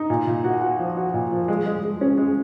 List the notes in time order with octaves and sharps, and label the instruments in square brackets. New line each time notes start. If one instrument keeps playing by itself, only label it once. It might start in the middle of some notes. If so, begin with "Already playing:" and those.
Already playing: [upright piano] D#4
A#2
A#2
F#4
F#4
F3
F#4
A#2
F3
G#3
G#3
G#3
C#4
G#3